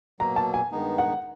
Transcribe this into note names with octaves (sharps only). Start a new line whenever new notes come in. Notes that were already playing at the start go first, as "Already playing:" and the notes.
B2 F#3 A#3 A#5
A5
G#5
G2 D#3 G#3 B3 D#4
F#5